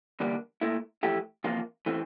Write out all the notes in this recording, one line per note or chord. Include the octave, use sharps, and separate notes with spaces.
E2 D3 G3 A#3 D4
A#2 A3 E4
F2 E3 A3 E4 G4
E2 C3 F3 A#3 F4
E3 A3 C4